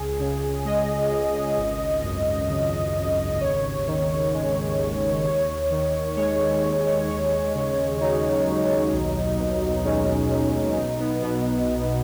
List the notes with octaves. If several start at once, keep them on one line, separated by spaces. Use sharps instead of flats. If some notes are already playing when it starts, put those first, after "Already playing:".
Already playing: C#2 G#4
C#3
G#3 D#5
C#2
G#1
F#2
C#3
G#1
D#5
D#2 C#5
D#3
G#3
D#2
D#2 C#5
D#3
G#3 C#5
D#2
D#2 C#5
C#3
F#3 D#4
D#2
B1
B2
G#3 C#4
B1
B1 D#4
B3
B2 B3